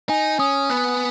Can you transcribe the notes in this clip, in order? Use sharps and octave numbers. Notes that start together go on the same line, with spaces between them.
D#4 G#5
C#4 D#6
B3 F#6